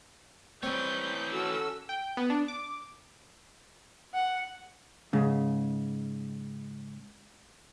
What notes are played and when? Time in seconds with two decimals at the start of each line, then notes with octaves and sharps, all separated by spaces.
0.63 E3 G3 C4 C#5 G6
1.32 C#4 F#4 A4 E6
1.89 G5
2.17 B3
2.30 D4
2.48 D6
4.14 F#5
5.13 G#2 C#3